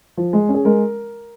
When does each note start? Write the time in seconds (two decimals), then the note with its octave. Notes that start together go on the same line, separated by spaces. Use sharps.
0.17 F3
0.33 G#3
0.49 C#4
0.54 G#4
0.65 G#3 A#4